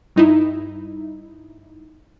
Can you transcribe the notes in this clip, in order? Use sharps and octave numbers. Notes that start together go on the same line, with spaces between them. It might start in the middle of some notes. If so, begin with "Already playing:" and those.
G2 D#4 E4